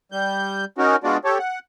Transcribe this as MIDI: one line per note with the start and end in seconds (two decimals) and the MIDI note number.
0.12 0.65 55
0.12 0.65 91
0.78 0.96 61
0.78 0.96 63
0.78 0.96 66
0.78 0.96 70
1.04 1.17 56
1.04 1.17 59
1.04 1.17 62
1.04 1.17 65
1.04 1.17 66
1.04 1.17 74
1.25 1.38 67
1.25 1.38 69
1.25 1.38 73
1.39 1.59 78